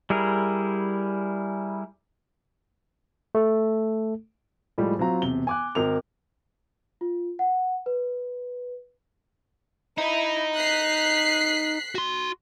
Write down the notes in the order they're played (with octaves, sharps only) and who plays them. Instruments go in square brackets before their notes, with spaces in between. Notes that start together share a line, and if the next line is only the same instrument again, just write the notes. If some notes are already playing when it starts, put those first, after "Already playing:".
[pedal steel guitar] G3 E4 G#4 A#4
[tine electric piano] A3 A4
[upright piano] A2 F3 G3 G#3
F#3 C4 F4 A#5
E1 C3 G7
G#5 D6 F#6
G#1 A#4 F7
[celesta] F4
F#5
B4
[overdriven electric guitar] D#4 [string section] E4
[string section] F#6 B6 C7
[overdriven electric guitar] F#4 C6